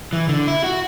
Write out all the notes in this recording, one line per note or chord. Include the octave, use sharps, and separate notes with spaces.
E3
D3
E4
F#4